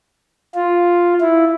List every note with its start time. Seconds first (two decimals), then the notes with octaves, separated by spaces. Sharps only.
0.54 F4
1.21 E4